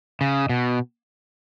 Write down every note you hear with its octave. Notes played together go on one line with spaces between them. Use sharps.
C#3
B2